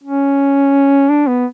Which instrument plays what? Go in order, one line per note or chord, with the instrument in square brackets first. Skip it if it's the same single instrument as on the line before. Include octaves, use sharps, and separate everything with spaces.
[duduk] C#4
D4
B3